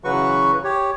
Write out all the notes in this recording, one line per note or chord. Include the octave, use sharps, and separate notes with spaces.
C#3 E3 F#3 F#4 B4 C#6
G4 C#5